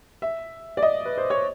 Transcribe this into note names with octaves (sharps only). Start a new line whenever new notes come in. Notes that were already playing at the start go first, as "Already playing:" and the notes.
E5
D5
D#5
B4
C5
C#5